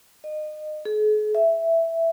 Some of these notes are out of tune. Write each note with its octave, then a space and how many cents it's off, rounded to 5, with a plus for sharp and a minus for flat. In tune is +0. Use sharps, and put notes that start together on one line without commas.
D#5 -30
G#4 +45
E5 +5